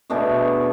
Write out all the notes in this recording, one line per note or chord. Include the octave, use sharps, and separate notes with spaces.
B2 A3 D4 G#4